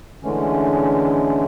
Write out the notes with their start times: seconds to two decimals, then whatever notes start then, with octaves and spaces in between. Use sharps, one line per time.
0.23 D3 E3 G#3 A3 C#4